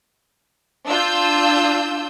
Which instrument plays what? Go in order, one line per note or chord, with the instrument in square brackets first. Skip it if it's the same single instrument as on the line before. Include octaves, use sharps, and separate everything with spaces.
[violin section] D4 F4 E6 G6